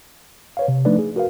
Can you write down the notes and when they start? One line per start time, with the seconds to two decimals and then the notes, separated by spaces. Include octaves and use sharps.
0.57 B4 C#5 F5
0.68 C3
0.85 F3 A3 D4 D#4 B4 D5
0.99 G#4
1.16 F#4 A#4 B4 F5